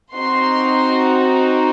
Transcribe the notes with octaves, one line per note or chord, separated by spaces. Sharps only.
C4 D#4 F#4 C6